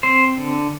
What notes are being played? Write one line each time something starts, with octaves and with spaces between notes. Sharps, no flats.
C4 C5
D3